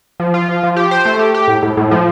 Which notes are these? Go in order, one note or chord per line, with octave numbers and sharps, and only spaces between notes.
F3
F4
F3
F3
G4
C5
A3
G4
G4
A2
A2
A2
F3